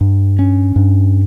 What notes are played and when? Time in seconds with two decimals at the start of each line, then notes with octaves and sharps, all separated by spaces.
0.01 G2
0.39 C#4
0.76 G2